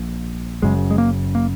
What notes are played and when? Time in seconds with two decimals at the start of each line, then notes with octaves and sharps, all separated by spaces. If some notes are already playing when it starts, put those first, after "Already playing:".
Already playing: A#1 A#2
0.62 F#1 F#2 C#3 G#3
0.91 G#3
0.98 A#3
1.35 A#3